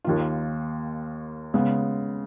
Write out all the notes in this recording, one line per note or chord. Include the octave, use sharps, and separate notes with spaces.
D#2 D#3 A#3 F4
C#3 G#3 B3